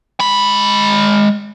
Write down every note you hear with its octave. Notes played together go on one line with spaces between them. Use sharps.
G#3 B5